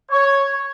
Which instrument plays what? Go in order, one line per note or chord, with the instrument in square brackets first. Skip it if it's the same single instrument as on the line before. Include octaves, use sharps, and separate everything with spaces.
[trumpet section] C#5